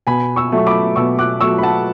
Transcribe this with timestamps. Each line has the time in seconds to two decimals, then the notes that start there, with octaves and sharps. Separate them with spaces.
0.07 B2 G#5 B5
0.36 C#6 E6
0.52 F#3 A3
0.58 C#6
0.67 B5 D6
0.96 B2 C#6 E6
1.19 D6 F#6
1.41 F#3 A3 C#6 E6
1.58 B5
1.62 F#5 A5